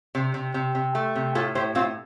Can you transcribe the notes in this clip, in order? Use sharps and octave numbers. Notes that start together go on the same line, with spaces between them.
C3
C3
C3
C3
A3
C3
A2 F4 A4
A2 G4 C5
A2 C4 F4